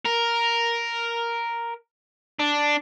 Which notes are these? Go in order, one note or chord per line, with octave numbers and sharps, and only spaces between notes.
A#4
D4